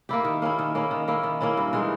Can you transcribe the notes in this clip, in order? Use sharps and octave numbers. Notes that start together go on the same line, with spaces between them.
A#3 E4 G4
D#3
A#3 C#4 E4
D#3
A#3 C#4 E4
D#3
A#3 C#4 E4
D#3
A#3 C#4 E4
G2
E3 G#3 D#4